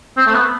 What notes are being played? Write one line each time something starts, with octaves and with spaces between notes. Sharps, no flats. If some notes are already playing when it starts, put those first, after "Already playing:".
C4
A3
B3